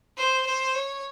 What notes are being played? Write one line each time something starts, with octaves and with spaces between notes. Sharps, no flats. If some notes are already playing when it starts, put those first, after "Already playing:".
C5
C5
C#5